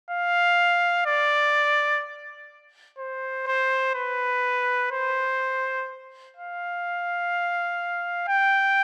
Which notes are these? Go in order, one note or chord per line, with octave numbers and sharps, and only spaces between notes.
F5
D5
C5
C5
B4
C5
F5
G5